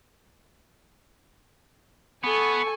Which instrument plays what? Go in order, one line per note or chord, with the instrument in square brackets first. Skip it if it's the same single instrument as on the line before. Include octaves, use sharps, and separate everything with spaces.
[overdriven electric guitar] B3 [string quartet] A4 G#5 C#6